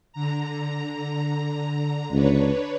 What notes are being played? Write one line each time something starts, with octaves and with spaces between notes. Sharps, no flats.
D3 A#5
C#2 D4 B4 C#5